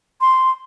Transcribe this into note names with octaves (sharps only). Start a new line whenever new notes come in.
C6